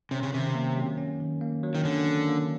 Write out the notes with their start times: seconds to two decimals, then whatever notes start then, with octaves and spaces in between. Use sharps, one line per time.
0.11 C3 C#4
0.23 C#3
0.33 C3 D#3
0.55 A#3
0.76 F#3
0.98 C#4
1.20 D#3
1.41 A#3
1.63 F#3
1.75 D#3
1.85 D3 C#4
2.07 D#3
2.28 A#3